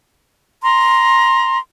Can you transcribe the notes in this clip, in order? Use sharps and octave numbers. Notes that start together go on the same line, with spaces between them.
A#5 C6